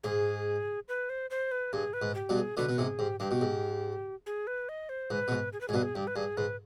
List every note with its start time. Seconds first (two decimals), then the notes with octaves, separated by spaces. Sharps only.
0.03 G#2 G#4
0.88 B4
1.10 C5
1.30 C5
1.51 B4
1.73 G2 G#4
1.93 B4
2.02 G#2
2.15 G4
2.29 G2 B2
2.36 G#4
2.57 B2 D3 B4
2.69 B2
2.78 G#2 C3 G#4
2.99 G#2 G4
3.20 G2 G4
3.31 B2
3.41 G#2
4.26 G#4
4.47 B4
4.69 D#5
4.89 C5
5.10 G#2 B4
5.28 B2
5.31 G#2
5.53 G#4
5.61 B4
5.68 G#2 G#4
5.73 G2 B2 B4
5.83 G#4
5.95 G2 G4
6.07 B4
6.16 G2 G#4
6.37 G#2 B4